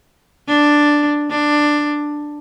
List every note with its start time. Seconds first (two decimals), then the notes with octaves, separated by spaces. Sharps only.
0.48 D4
1.31 D4